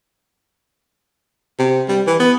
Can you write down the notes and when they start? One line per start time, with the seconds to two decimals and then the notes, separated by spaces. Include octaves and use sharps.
1.59 C3
1.88 G3
2.07 E3
2.19 B3